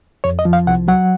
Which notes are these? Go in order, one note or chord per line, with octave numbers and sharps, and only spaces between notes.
F2 C#5
D#5
F3
F5
C2 F#5
F#3 F#5